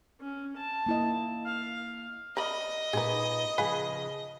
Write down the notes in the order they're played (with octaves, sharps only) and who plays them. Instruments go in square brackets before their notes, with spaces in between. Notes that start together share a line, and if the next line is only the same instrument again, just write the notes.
[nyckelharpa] C#4
A5
[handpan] A#3 E4 D#5
[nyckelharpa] F5
[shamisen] A#4 D5 B5 [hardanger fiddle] D#5
[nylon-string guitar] A#2 D#4 B4 [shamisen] G#4 A#4
[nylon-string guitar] C#3 F3 G#4 [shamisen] B4 F5 G#5